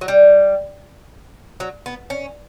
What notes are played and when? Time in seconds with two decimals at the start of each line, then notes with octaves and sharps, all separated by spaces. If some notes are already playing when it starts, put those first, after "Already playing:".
0.01 F#3
0.08 G3
1.60 F#3
1.86 B3
2.10 C#4